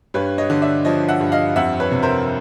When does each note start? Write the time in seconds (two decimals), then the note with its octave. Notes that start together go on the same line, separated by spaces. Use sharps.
0.14 G2 B4 C#5
0.38 C#5 D#5
0.50 D3
0.61 D5 E5
0.85 F3 C#5 D#5
1.08 E5 F#5
1.20 G2
1.32 D#5 F5
1.56 F2 E5 F#5
1.80 B4 C#5
1.92 C3
2.03 A#4 C5